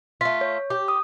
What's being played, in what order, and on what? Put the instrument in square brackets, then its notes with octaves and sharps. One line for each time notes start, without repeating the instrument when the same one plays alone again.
[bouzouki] A3 F4 [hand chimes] B6
[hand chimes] C#5
[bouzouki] G4
[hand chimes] D#6